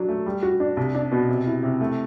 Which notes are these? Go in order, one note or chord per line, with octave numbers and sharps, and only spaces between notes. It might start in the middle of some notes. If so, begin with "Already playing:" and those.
Already playing: F#3 D4
A3
G3
F#4
D4
C2
D4
B2
C3
E4
C3
A3